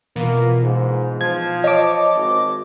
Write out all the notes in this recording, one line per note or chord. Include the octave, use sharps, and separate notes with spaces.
B2 E3 A#3 F4
G#2
F3 G#6
C#5 D#5 A5 D6
G#1